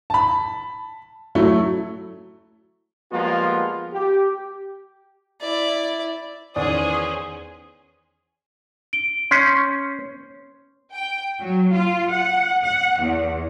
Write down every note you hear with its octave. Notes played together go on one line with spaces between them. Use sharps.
A5 B5
F#3 A3 E4
F3 G3 G#3 A#3 B3 F4
G4
E4 D5
E2 D#3 E3 C#4 G#4 C5 D5 D#6
D7 G7
C#4 C6 G6 C7
G5
F#3
F4
F#5
F#5
E2